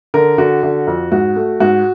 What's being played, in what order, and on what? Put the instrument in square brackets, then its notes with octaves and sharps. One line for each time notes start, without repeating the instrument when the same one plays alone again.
[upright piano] D3 A#4
D3 F#4
D3
F2
G#2 F#4
A3
G#2 F#4